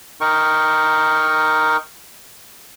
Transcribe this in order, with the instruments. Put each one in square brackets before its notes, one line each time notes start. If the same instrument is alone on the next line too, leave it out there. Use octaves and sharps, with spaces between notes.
[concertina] D#4 A#4 G5 C#6